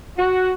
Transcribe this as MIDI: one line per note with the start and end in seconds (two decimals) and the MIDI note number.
0.18 0.53 66